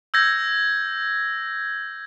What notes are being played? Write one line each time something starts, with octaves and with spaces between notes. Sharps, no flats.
E6 G6 G#6 A#6